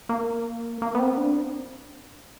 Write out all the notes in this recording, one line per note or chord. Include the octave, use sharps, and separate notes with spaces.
A#3
A#3
B3
C4
D4